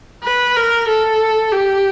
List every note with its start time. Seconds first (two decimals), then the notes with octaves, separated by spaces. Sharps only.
0.24 B4
0.57 A#4
0.88 A4
1.52 G4